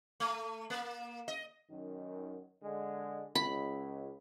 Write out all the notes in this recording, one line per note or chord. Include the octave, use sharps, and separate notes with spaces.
A3
A#3
D#5
F#2 D#3
D3 G#3
C#2 B5